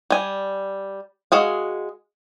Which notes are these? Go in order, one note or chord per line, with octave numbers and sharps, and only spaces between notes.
G3 G#5
G#3 F#4 G#4 F5